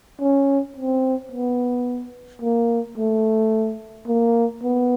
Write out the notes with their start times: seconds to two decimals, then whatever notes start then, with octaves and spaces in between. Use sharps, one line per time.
0.21 C#4
0.76 C4
1.31 B3
2.42 A#3
2.98 A3
4.07 A#3
4.63 B3